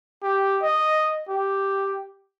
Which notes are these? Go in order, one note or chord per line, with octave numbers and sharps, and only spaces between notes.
G4
D#5
G4